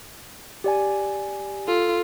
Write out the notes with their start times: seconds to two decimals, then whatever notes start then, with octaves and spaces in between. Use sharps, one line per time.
0.64 G4 D5 G#5
1.68 F4 A4